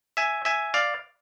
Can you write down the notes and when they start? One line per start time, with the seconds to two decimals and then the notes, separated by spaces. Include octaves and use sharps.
0.17 E5 G#5
0.45 E5 G#5
0.74 D5 F5